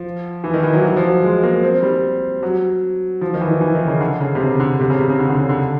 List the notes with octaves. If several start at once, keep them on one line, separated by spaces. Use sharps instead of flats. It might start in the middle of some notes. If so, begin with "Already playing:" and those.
Already playing: F3
E3
D#3
E3
F#3
F#3
F3
F#3
G#3
A#3
C4
G3
F#3
F3
D#3
E3
E3
D#3
C#3
D3
C#3
C3
C#3
D3
C3
C#3
C3
C#3
D3
D3
C#3
D3